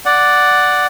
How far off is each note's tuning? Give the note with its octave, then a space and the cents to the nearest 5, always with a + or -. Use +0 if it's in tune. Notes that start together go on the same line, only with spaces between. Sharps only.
D5 +0 F#5 +0